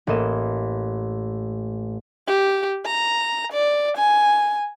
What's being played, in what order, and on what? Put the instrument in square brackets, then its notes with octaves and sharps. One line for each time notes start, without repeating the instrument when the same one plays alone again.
[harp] A1 A#3 D#5 E7
[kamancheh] G4
A#5
D5
G#5